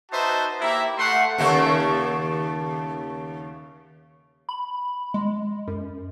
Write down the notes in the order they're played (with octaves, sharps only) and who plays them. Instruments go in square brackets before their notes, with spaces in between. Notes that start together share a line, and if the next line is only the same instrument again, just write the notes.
[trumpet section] D#4 F#4 B4 C5 E5 A5
A#3 E4 G4 E5 A#5
A3 F#5 C6
[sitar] D#2 C#3 A3
[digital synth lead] B5
G#3
F#2